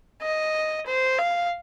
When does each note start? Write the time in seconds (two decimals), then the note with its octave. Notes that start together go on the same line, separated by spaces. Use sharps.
0.22 D#5
0.86 C5
1.19 F5